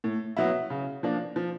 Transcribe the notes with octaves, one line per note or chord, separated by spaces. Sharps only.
A2
F#3 B3 E4
C#3
F3 A#3 D4
F3